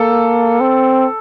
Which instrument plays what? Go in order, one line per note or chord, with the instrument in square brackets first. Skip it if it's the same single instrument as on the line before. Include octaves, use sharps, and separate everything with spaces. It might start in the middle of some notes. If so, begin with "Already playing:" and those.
Already playing: [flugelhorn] A#3 [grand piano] A4
[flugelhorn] C4